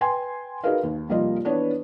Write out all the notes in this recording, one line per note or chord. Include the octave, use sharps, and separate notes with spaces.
B4 G5 G#5 C6
D#4 F#4 G#4 A#4 B4 F5
D#2
F1 G3 A#3 F4 D#5
E3 B3 D4 B4 C#5